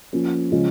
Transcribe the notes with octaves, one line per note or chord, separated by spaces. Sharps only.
F3 A#3 C#4
C#3 F3 G#3 C#4 F4